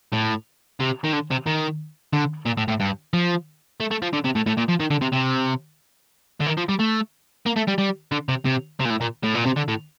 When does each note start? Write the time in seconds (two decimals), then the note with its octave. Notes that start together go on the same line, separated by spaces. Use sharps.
0.13 A2
0.80 C3
1.04 D#3
1.13 D3
1.31 C3
1.46 D#3
2.13 D3
2.46 A#2
2.58 A2
2.68 A2
2.80 G2
3.14 F3
3.80 A3
3.91 A3
4.02 F3
4.13 D3
4.24 C3
4.35 A2
4.46 A2
4.57 A#2
4.68 F3
4.80 D#3
4.91 D3
5.02 C3
5.13 C3
6.40 D3
6.46 D#3
6.57 F3
6.69 G3
6.79 A3
7.46 A#3
7.57 A3
7.68 G3
7.79 G3
8.12 D3
8.29 C3
8.45 C3
8.80 C3
8.85 A#2
8.90 A2
9.01 A#2
9.24 A2
9.35 A#2
9.46 C3
9.57 D3
9.68 A2